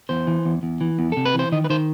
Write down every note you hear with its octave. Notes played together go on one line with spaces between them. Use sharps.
E2 C5
E3
E2
E2
E3
E2
C3 A4
B4
E3
C5
D#3 D#5
B4
D#3 C5